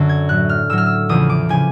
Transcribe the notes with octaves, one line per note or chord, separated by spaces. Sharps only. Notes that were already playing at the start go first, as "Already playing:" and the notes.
Already playing: F#2 D3 F#3
G#6
A2 F#3 F#6
F6
A2 F#3 E6
F6
E6
E2 C#3 F3 D#6
D6
C#3 F3 G#5